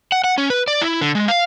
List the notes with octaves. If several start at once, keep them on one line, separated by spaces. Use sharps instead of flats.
F#5
F#5
C#4
B4
D5
E4
D3
G#3
F5